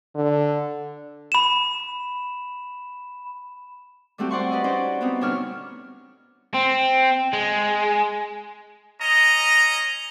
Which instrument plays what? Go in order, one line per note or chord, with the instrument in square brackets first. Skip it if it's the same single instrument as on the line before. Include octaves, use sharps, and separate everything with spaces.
[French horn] D3
[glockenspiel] B5 E7
[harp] G3 A3 C4 F#4 G4
C5 D5 F#5 C6 C#6
B4 D5 D#5
C#4 D#4 F#4 C5 D5
B3 C4 D#4
D2 B2 G3 D4 C#5 F6
[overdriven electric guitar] C4
G#3
[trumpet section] C#4 D#5 A#5